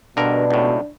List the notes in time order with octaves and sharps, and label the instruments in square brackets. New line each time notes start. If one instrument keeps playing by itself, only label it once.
[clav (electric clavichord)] G2 D3 A#4 [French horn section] B2 [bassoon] D4
[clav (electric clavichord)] C#2 A2